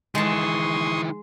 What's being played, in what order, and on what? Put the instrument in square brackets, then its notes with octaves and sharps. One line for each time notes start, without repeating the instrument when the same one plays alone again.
[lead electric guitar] D#3 E3 [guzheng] G#3 A5 [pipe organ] C6 C#6 D#6